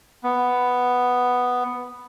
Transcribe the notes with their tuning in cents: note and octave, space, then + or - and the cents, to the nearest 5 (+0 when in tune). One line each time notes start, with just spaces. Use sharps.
B3 +5